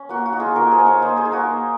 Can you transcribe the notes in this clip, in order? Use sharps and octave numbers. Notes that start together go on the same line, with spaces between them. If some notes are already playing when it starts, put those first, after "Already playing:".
Already playing: C#4
A#3 F#4
F#4
D#4
F4 G#4
A#3 F#4 A#4
G#4 C5
D#4
C#5 F5
A#3 C5 D#5
G#4 C5
D#4
F#4 A#4
A#3